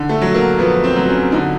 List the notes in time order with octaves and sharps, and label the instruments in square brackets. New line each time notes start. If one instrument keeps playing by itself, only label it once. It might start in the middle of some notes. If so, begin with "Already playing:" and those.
Already playing: [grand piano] D3
[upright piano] A3
[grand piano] F#3
[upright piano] A#3
[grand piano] F2 [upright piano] B3
[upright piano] C4
[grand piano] F#3
[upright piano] C#4
[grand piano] D3 [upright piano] D#4